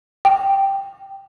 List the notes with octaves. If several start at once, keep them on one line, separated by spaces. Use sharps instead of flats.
G5